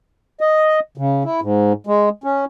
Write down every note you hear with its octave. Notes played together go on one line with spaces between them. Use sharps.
D#5
C#3
E4
G#2
G#3
C#4